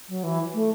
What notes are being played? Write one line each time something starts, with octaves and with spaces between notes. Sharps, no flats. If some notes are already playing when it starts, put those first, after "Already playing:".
F#3
E3
A3